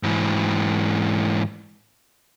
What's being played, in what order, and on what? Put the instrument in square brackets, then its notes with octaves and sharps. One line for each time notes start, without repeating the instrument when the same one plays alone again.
[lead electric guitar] G#2 E3